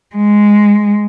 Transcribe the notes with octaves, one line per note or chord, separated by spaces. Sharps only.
G#3